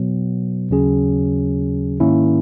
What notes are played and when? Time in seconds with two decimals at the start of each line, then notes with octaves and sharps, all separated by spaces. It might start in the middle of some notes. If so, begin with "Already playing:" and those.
Already playing: B2 F#3 B3
0.70 D#2 C#3 F#3 C#4 G#4
2.00 G#2 D#3 A#3 C#4 E4